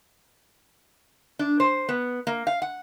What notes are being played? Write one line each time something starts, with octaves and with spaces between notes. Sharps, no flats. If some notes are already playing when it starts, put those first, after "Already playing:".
D4
C5
B3
A#3
F5
F#5